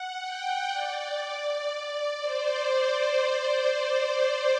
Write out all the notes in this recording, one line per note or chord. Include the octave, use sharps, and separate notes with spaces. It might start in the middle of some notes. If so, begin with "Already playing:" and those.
Already playing: F#5
G5
D5
C5